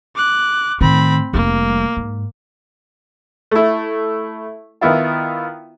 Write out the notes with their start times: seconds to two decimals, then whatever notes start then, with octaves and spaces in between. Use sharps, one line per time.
0.16 D6 F#6
0.81 A2 D#3 C4 B5
1.33 F1 G3 A#3
1.97 G#2
3.51 A3 E4
4.81 D#3 B3 E4 F4